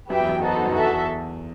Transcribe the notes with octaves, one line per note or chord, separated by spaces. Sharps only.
F#2 G4 B4 E5 G5
E2
F#2
B3 D#4 F#4 A4 C5
F#2
E2 F#4 A4 E5
E2